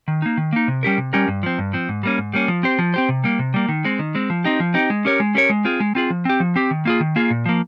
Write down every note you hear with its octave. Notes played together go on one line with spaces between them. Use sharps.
D#3
A#3 D#4
D#3
A#3 D#4
C3
G3 C#4 G4 A#4
C3
G3 C#4 G4 A#4
G2
F3 C4
G2
F3 C4
G#2
G3 A#3 C#4
G#2
G3 A#3 C#4
F3
C4 G4 C5
F3
C4 G4 C5
C3
G3 A#3
C3
G3 A#3
D#3
G#3 C4
D#3
G#3 C4
F3
C4 D#4 G4
F3
C4 D#4 G4
G#3
C#4 G4 A#4 C#5
G#3
C#4 G4 A#4 C#5
G#3
C4 F4 G#4
G#3
C4 F4 G#4
F3
C4 G4
F3
C4 G4
D#3
A#3 F4 G#4
D#3
A#3 F4 G#4
A#2
F3 A#3